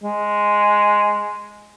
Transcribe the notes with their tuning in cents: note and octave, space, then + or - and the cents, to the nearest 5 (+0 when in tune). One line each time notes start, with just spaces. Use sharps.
G#3 +0